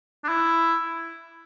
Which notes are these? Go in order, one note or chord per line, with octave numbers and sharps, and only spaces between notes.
D4
E4